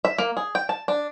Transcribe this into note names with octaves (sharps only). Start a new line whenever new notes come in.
E5
A#3
G#4
G5
A5
D4